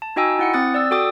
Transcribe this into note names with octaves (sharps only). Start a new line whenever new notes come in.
A5
D#4 F#4 D#5 G5 G#5 E6
E4 F#5 C#7
C4 D#6 F#6 A6
D5 E6
F#4 A4 G5 D6 D#6